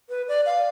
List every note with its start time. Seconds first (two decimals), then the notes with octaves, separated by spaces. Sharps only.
0.09 B4
0.28 D5
0.46 F5